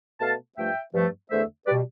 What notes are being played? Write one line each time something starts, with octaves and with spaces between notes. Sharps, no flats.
B2 A3 F5 A5
G2 F3 A3 E5 G5
G2 F3 A3
E2 D3 A3 C5 E5
B2 G3 B4 D5